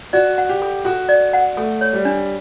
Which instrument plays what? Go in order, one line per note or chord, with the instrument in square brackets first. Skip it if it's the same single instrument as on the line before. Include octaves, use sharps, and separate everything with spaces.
[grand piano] F#4 [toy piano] D5
[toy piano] F#5
[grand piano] G4
[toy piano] A4
[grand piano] F#4 [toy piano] A4
[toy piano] D5
F#5
[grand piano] A3 [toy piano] A4
[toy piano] C#5
[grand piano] G3
[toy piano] D4